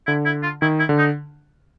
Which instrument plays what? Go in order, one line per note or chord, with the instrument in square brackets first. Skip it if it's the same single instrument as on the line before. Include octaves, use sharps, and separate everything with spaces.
[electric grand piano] D3 [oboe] E4
[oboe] E4
F4
[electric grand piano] D#3 [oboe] E4
[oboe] E4
[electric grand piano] D3
[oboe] D#4